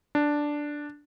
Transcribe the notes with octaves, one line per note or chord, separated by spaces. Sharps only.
D4